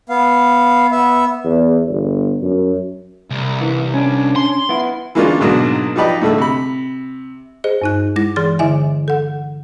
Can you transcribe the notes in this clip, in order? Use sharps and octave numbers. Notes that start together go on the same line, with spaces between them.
B3 F5
B3 E5
E2
G1
F#2
C2
E3
C#4 D4
C6
B3 E4
E3 G#3 A#3 C#4 D4 F4
G#2 B2 F#3 A#3 D4
F3 D#4 G4 B4 D5 D#5
A2 D3 A3 E6
C3 B5
G#4 C5 D#5
G2 D#4 F#6
G#3 E4 A#6
E3 G#4 C6 A6
D3 E4 D#5 E5 G#5
A4 F#5